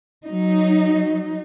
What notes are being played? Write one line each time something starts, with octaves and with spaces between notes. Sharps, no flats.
F#3 D#4